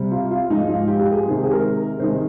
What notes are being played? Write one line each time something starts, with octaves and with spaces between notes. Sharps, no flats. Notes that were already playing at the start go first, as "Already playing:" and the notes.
Already playing: C3 G3
F4
F4
G#2 F3 G#3 D#4
F4
G4
G4
G#4
C3 D#3 G#3
G4
G#4
A#4
C3 D#3 G#3 C5